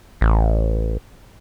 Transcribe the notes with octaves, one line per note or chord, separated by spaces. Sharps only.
A1